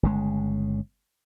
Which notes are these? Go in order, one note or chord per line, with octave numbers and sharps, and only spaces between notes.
G1 C#3 G#3